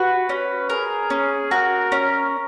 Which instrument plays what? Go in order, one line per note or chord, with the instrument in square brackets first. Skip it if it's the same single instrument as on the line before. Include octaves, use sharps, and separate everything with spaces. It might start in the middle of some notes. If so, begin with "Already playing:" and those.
Already playing: [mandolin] F#4 [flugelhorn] B4
[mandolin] C#4
[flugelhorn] G#4 [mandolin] A#4
[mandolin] C#4
[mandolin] F#4 [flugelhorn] A#4
[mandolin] C#4